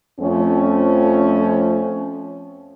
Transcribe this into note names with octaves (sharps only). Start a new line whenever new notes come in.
F2 F3 A3 C4 C#4